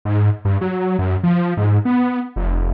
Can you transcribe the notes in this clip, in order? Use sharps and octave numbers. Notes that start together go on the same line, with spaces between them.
G#2
G2
F#3
F#2
F3
G#2
B3
F1